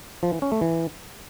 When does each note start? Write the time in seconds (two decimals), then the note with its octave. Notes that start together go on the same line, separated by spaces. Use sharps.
0.23 F3
0.32 E3
0.42 C#4
0.52 A3
0.61 E3